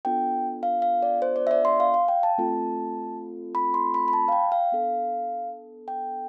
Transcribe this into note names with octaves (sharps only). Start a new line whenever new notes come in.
B3 D4 F4 A4 G5
F5
F5
D5
C5
D5
E5
D5
C6
F5
F5
G5
A5
A3 C4 F4 A4
B5
C6
B5
B5
A5
F5
G5
F5
B3 D4 A4
G5